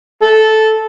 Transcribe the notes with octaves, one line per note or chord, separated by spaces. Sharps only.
A4